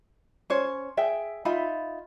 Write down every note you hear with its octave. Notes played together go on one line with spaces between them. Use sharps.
C#4 C5 C#5
G#4 E5 G5
D#4 F4 E5 B5